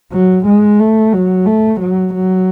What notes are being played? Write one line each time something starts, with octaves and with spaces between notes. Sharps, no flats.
F#3
G#3
A3
F#3
A3
F#3
F#3